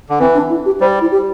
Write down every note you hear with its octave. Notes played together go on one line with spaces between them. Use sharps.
D3
E3 C4
D4
E4
G4
G3 C5
E4
G4